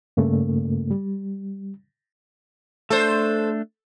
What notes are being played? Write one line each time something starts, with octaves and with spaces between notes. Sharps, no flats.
G2 C#3 A3 A#3
G3
A3 D4 A4 C5